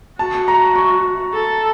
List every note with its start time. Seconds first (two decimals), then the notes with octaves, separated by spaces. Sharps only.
0.18 F#4 A5
0.48 A#5
0.76 C#6
1.33 A4